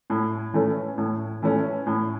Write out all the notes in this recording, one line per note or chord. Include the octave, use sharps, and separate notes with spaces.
A2
E3 A3 C#4
A2
E3 A3 C#4
A2